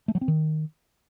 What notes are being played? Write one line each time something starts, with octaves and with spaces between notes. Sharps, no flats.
A3
F#3
C4
D#3